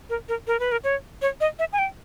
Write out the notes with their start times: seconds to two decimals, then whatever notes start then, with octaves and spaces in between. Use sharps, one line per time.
0.10 A#4
0.29 A#4
0.47 A#4
0.60 B4
0.72 A#4
0.84 C#5
1.22 C#5
1.41 D#5
1.59 E5
1.73 G#5
1.79 G5